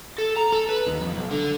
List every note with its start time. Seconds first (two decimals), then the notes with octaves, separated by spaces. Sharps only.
0.19 A4
0.37 A#5
0.52 A4
0.69 B4
0.86 D#2
1.01 F2
1.14 B1
1.31 D3